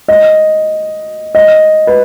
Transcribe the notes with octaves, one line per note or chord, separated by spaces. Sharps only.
D#5
D#5
B4